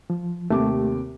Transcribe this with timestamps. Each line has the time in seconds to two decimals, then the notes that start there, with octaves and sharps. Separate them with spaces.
0.10 F3
0.50 D#2 C3 A3 D6